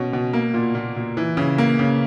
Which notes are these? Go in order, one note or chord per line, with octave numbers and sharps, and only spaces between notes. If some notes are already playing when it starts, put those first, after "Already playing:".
Already playing: B2 C#4
B2
A#3
A#2
A#2
A#2
E3
C#3
A#3
C#3